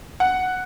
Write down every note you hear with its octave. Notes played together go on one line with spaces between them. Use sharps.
F#5